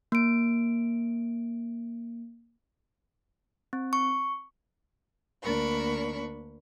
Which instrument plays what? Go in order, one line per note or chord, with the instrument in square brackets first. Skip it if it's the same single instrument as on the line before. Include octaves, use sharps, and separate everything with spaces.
[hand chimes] A#3 D7
C4
C#6
[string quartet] D2 A#3 D4 A#4 B5 C#6